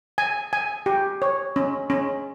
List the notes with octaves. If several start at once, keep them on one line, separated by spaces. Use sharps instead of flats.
G#5
G#5
G4
C#5
C#4
C#4